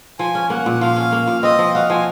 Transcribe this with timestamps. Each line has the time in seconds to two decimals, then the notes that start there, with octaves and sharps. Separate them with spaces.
0.19 F3 G#5
0.35 C#4
0.50 A#3 F#5
0.66 A#2
0.81 F3 F5
0.96 C#4
1.12 A#3
1.27 A#2
1.43 C4 D#5
1.59 F3
1.75 F#4 F5
1.90 F3 G#5